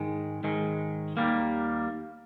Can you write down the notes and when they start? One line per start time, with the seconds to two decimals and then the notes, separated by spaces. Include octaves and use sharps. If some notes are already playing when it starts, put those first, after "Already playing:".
Already playing: G#2 D#3 G#3
0.44 G#2 D#3 G#3
1.17 D#2 D#3 G3 A#3